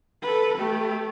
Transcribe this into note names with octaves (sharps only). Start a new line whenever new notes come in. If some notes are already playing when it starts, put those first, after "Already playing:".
A4 B4
A3 G4